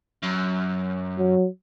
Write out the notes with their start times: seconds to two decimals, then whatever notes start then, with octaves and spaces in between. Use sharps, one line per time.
0.23 F#2
1.18 F#3